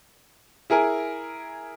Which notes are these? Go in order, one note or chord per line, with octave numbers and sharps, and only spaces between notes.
E4 G#4 A#4 G#5